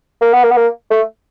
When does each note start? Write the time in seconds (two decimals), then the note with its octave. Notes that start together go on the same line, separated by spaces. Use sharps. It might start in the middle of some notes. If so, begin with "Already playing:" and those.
0.21 A#3
0.33 B3
0.44 A#3
0.51 B3
0.57 A#3
0.91 A3